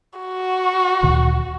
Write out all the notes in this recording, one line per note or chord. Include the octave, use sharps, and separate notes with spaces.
F#4
D2 A#2 D#3